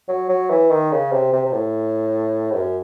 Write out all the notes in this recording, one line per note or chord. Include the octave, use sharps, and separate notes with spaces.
F#3
F#3
E3
D#3
C#3
C3
C3
C3
A2
G#2
F#2